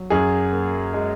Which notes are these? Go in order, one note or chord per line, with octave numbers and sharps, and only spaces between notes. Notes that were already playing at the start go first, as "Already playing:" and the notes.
Already playing: F#3
F#2 G#4
A#3
G#3